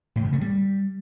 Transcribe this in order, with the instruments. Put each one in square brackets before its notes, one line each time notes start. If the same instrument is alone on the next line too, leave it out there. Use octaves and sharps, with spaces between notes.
[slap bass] A2
C#3
A3
G3